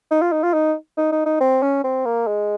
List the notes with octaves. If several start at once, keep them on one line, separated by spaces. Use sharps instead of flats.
D#4
F4
D#4
F4
D#4
D#4
D#4
D#4
C4
C#4
C4
A#3
G#3